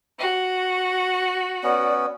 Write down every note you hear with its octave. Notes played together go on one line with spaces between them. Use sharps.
F#4
B3 C#4 D5